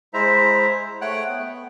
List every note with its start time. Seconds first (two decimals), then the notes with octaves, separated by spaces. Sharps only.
0.14 G#3 E4 C5 E5 A#5
1.01 A3 C#5 F#5 G5 F#6
1.28 B3